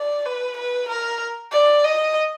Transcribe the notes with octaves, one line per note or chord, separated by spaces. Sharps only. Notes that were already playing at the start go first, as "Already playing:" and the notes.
Already playing: D5
B4
B4
A#4
D5
D#5